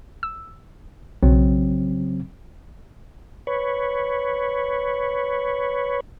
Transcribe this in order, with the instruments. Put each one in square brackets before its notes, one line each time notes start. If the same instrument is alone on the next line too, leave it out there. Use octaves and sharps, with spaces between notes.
[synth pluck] E6
[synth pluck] B1 [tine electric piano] C#3 F#3 C4
[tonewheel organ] B4 C#5